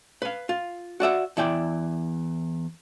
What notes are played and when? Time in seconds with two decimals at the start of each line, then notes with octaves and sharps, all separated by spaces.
0.22 B4 F5
0.49 F4
1.00 F#4 D5 E5 F#5
1.37 E2 E4 D5 G5